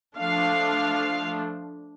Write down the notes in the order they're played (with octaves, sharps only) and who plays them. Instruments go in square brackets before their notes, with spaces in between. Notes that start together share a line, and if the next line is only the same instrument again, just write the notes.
[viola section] F3 A3 D4 F5